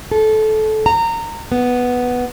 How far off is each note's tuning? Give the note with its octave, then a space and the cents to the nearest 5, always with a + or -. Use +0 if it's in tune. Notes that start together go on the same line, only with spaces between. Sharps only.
A4 -20
A#5 -25
B3 +0